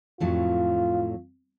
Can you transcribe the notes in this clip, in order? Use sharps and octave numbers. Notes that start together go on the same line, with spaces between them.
F2 A2 F#3 F4